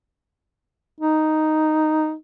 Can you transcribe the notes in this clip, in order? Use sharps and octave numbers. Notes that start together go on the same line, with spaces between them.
D#4